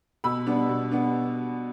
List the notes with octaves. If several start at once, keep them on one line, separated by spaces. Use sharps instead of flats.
B2 B5 E6
G3 B3 D4
B2
G3 B3 D4